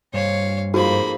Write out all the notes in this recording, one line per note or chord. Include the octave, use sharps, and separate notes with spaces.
G2 G3 C5 C#5 F5
F2 G#2 F3 A#3 F#4 B5